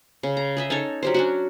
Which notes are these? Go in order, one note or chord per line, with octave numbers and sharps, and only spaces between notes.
C#3
A#5
G#4 D#5 E5
C#4 D#4 A4 C#5
F#3 G4 C5
C#4 D4 F#4